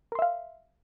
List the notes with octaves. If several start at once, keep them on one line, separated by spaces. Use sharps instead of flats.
A#4 E5 F5 C6